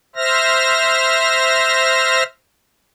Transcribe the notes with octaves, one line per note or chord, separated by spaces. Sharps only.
C5 E5 F6 A#6